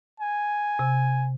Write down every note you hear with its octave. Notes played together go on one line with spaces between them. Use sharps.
G#5
C3